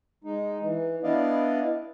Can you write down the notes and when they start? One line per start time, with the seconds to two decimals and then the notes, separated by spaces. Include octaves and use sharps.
0.24 G#3 D#4
0.63 E3
1.03 B3 D4 E4 D5 D#5 F5